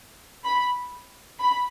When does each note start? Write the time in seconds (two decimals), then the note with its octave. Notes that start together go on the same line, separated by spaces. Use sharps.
0.44 B5
1.40 B5